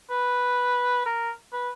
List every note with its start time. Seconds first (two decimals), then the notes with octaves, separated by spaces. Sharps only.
0.10 B4
1.06 A#4
1.53 B4